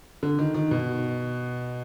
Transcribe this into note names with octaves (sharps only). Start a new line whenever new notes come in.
D3
D#3
D#3
B2